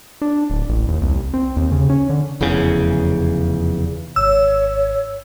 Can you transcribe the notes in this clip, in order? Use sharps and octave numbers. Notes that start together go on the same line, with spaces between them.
D4
D1
A1
D#2
C2
C4
D#2
C#3
C#4
D3
F1 E2 C#3
G#1 G#2 C#5 E6